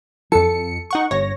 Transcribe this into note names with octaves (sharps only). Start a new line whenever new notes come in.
F2 A4 C#7
D#4 F#5 C#6
G1 C#5 A#6